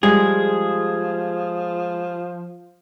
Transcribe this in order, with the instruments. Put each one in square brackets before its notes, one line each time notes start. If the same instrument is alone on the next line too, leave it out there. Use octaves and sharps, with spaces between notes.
[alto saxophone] F3 [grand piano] G3 [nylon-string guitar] G#3 [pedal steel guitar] G#4